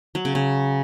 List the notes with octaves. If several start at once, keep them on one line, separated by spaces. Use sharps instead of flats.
F#3
C#3
C#3